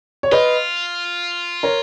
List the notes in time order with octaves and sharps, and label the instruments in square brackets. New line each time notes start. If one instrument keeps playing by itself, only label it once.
[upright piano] C#5
[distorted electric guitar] F4 [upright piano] B4 D#5
[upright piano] A#4 C#5